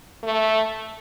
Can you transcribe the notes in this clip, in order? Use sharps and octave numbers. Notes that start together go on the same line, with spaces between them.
A3